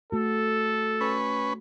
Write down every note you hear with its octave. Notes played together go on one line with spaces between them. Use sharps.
A3 F#4 A4
C#4 B4